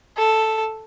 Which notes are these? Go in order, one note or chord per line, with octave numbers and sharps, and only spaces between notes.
A4